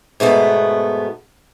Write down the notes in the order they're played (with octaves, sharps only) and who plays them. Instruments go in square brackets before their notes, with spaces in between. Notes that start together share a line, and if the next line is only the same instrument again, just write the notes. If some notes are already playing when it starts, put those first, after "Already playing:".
[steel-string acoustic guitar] G#2 B2 A3 B3